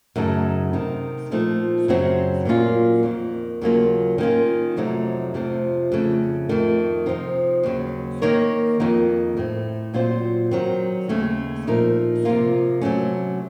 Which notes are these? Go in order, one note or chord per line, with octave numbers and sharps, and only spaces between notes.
F#2 C#3 A3 D#4 A4
C3 D#3 A3 D#4
A#2 F3 A3 C4 D#4
F#2 C#3 F#3 C4 F#4
A#2 F#3 A#3 C#4 F4
F2 D#3 A#3
D#2 C#3 F#3 A#3 F4
D#3 A#3 C#4 F4
F2 C3 F#3 A3 D#4
F2 C3 F3 A3 C4
F2 C#3 A3
F2 D#3 A3
C3 F3 C4 D#4
D#2 C#3 F#3
D#3 A#3 D#4 A#4 C#5
F2 D#3 A#3 D#4
A2 A3 C4
A#2 F#3 C4 F4 C5
D#3 F#3 C4
D#2 C#3 A3 C#4
A#2 F3 A3 D#4 A#4
C3 F3 A#3 F4
C3 F#3 A3 C#4